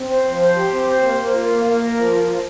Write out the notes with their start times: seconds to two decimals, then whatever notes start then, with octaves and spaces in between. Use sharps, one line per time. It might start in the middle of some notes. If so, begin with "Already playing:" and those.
Already playing: C4
0.09 C5
0.25 F3
0.41 C5
0.55 G4
0.72 C4
0.87 C5
1.02 A#3
1.18 A#3
1.33 F4
1.49 A#3
1.65 A#3
1.81 A#4
1.96 F3
2.12 F4
2.27 F4